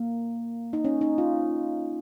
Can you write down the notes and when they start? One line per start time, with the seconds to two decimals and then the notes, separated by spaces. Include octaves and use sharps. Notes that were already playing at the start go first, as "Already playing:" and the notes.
Already playing: A#3
0.73 D#4
0.85 C#4
1.01 D#4
1.18 F4